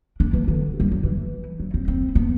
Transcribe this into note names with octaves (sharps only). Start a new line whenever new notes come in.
D4
E3
D3
G3
F#3
E3
F#3
C4
C4
B3